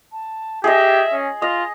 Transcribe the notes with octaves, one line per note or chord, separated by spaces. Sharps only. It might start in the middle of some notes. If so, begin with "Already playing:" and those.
A5
G4 G#4 D#5 E5
C#4
F4 D#5 F7